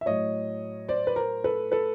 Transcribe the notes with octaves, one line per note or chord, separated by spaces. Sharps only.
E5
A2 F#3 C#5 D#5
C5 D5
B4
A#4 C5
A4 B4
A4 B4